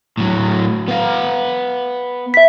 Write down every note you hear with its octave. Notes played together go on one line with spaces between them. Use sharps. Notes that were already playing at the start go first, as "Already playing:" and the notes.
A2 F#3
B3 F5
E5 B6